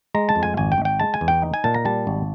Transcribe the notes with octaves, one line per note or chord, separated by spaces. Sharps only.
G#3 A#5
A5
F2
G#5
G#1 G#5
G5
G#1
G5
G#3 A5
G#5
E2
G5
D#4
G#5
A#2 A5
A#5
G3 A5
G#1